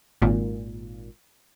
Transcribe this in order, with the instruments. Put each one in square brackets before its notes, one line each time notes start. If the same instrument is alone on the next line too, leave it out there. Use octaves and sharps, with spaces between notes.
[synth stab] G#1 A#2